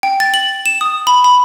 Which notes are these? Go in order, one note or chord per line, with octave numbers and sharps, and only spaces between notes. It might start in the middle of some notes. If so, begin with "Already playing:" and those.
G5
A6
F#7
E7
D#6
B5
B5